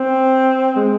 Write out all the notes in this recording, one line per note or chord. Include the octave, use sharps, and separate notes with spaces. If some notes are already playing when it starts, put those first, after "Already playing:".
Already playing: C4
G#3